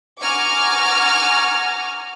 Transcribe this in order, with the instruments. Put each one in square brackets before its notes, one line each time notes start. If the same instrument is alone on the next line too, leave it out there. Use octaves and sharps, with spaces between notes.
[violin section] F#5 G#5 A#5 C#6 D6 F6